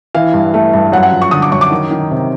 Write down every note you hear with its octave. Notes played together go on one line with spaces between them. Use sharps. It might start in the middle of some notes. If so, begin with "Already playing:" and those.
E3 F5
G2
A3
G2
F#2 F#5
F#5
F3
C#6
D3 D#6
D6
F#2 C#6
D6
D#3
D#3
C3